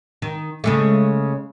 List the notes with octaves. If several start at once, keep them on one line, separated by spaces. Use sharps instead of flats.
D#3
C#3 G#3 A3